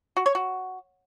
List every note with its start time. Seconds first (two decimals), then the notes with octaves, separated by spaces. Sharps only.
0.17 F#4
0.26 C#5
0.35 F#4